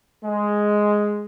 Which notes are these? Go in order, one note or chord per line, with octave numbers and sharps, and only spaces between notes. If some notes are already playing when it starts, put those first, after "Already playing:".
G#3